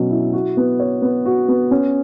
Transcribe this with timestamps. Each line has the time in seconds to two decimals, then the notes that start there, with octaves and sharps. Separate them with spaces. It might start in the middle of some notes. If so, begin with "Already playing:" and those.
Already playing: B2 F#3 C#4
0.11 E4
0.33 F#4
0.57 B3
0.80 C#5
1.02 B3
1.26 F#4
1.48 B3
1.71 C#4